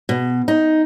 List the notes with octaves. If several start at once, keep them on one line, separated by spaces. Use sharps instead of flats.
B2
D#4